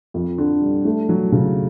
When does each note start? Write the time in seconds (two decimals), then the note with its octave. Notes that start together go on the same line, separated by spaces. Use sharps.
0.14 F2
0.38 D3
0.61 G3
0.85 A3
1.09 F#3
1.32 C#3